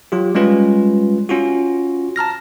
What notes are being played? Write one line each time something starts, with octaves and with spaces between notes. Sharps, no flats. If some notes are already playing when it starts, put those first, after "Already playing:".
F#3 F4 G4
G3 G#3 C#4 F4 B4
C#4 F4 F#4
A5 A#5 F6 A#6